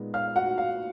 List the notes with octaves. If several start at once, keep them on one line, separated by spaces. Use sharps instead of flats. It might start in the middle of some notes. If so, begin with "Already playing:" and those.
Already playing: A#2 G#3 B3 D#4
F5 F6
F#4 F#5
F5